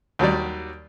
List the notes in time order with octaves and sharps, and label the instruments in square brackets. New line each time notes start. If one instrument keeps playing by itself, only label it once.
[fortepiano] D#2 F#3 G3 D5